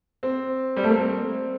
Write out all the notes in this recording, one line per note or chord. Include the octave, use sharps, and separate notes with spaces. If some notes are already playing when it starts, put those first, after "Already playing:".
C4
G3
A3
A#3
C4